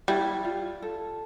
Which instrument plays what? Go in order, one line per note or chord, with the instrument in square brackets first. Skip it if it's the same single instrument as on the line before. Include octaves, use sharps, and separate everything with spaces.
[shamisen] G3 [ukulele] E4
[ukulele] F4
A4